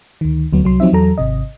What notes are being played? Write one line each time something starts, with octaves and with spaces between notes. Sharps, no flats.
D2 D#3
D2 F#3 B3
C2 F#3 C6
F3 F#3 C4 D#4 E5
E2 F#3 A4 A#5
G#1 C3 D#5